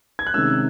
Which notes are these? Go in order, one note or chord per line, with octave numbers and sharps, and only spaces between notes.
G#6
F#6
C3 D#3 G#3 C#4 E6